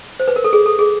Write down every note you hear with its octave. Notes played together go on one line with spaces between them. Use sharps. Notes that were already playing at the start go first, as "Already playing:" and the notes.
C5
B4
A#4
A4
G#4
A4
G#4